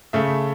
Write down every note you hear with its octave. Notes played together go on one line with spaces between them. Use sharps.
C#3 A3 E5